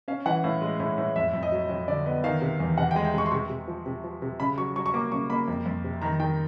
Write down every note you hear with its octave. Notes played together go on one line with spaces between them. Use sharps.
C#4 F5
E3 F#5
A2 F5
G#3
A2
A2
F2 E5
F2
D#5
F#3
F2
D3 D5
B3 D#5
D#3 F5
C3
E2
C3 F#5
G5
G#3
G5
C3 C#6
C6
C3 C#6
C3
F3
C3
F3
C3
C#3 B5
F#3 C#6
F#3 C#6
C#6
A#3 D6
C#3 C#6
A#3 B5
F2
F2
C3
D#3 A#5
D#3 G5